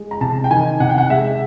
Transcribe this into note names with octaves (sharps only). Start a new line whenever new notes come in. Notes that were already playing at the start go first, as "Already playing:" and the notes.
Already playing: G#3
A#5
C3 A5
G5
D#3 G#5
C3 F#5
G5
F#5
G#3 E5